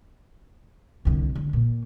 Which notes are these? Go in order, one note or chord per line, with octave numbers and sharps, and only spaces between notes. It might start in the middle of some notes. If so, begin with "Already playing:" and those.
C2 D3
D3
A#2